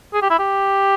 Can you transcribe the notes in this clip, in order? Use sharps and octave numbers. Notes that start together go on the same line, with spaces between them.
G#4
G4
E4
G4